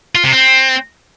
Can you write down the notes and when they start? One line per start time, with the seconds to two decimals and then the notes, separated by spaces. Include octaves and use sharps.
0.15 F4
0.24 C3
0.33 C4